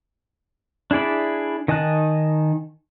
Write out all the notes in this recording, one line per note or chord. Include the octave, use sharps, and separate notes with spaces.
D4 E4 G#4 D5 B5
D#3 D#5 G#5 A5 F#6